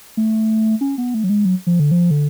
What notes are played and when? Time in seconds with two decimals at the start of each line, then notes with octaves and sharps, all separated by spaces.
0.17 A3
0.81 C#4
0.98 B3
1.14 A3
1.24 F#3
1.29 G#3
1.45 F#3
1.67 F3
1.80 D3
1.91 F3
2.11 D3